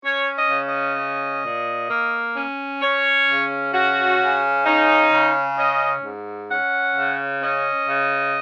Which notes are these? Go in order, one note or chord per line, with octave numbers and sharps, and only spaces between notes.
C#4 C#5
D#5
C#3
D#5
C#4
A#2
A#3
C#4
C#4 C#5
C#3
C#4 F#4
C#3
C#4 D#4
C#3
C#4 D#5
G#2
C#4 F#5
C#3
C#4 D#5
C#3